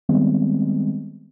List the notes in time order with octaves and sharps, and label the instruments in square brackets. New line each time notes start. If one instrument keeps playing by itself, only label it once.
[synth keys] D#3 G3 G#3 B3 C4